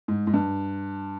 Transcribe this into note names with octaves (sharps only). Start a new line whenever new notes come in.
G#2
G#2
G2